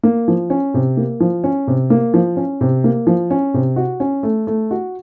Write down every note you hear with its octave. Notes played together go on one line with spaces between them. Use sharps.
A#3
F3
C#4
C3
A#3
F3
C#4
C3
A#3
F3
C#4
C3
A#3
F3
C#4
C3
F#4
C#4
A3
A3
F#4